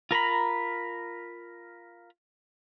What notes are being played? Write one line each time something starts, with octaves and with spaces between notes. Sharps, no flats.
F4 A#4 A#5 B5